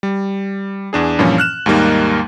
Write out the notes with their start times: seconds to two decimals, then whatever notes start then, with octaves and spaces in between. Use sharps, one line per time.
0.03 G3
0.93 E2 D4 G#4
1.19 G2 A#2 E3 F3 C#4
1.38 F6 F#6 E7
1.66 D#2 G#2 G3 A#3 D#4